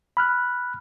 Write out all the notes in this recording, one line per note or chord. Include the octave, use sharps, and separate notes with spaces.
B5 F6 F#6